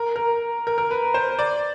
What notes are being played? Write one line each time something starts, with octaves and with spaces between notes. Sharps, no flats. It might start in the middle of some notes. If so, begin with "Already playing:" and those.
Already playing: A#4
A#4
A#4
A#4
B4
C5
D5